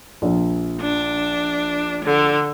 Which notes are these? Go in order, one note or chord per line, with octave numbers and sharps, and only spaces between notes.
A#1
D4
D3